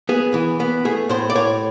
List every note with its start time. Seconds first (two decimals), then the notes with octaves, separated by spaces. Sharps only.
0.09 B3 G#4
0.34 E3
0.60 B3
0.85 A3 G#4
1.09 A2 C5
1.30 D5
1.35 A2 C#5